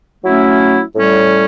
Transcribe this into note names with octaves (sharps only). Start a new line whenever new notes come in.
F#3 A3 C#4 E4
A2 G3 C#4